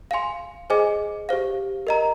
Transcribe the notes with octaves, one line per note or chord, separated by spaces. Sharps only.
F5 G#5 C6
G#4 C5 D#5 G#5 D6
G4 C5 F5
A#4 D#5 A#5